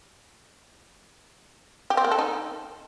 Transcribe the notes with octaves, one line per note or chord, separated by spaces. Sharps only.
G4
C4
A#3
A4
D#4